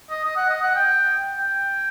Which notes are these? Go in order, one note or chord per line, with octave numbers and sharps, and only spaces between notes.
D#5
D#5
F#5
D#5
F#5
G5
G5